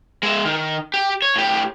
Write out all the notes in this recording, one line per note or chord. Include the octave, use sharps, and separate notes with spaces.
G#3 E5
D#3
G4
C#5
A2 G4